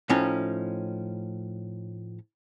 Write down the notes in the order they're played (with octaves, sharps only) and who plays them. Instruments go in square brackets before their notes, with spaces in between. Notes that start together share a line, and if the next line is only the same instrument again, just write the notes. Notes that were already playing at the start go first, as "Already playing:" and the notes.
[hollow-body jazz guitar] A2 F3 C#4 D#4